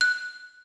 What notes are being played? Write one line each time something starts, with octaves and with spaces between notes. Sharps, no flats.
F#6